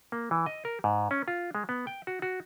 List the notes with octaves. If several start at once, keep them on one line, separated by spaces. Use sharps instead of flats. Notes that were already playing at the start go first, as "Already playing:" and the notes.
A#3
E3
D#5
A#4
G#2
C#4
F4
G#3
B3
G5
F#4
F#4